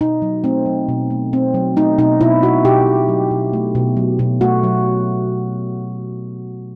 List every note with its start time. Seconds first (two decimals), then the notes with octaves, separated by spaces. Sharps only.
0.01 B2 D#4
0.22 F#3
0.44 A3 C4
0.66 F#3
0.89 B2
1.10 A3
1.33 A3 C4
1.54 F#3
1.77 A3 D#4
1.98 B2 D#4
2.21 B2 E4
2.43 B2 F#4
2.65 B2 G4
2.87 B2
3.09 F#3
3.31 B2
3.53 A3
3.75 B2
3.97 F#3
4.19 B2
4.41 A3 F#4
4.63 F#3